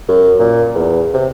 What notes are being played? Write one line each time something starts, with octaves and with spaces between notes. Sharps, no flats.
F#2
A#2
E2
C3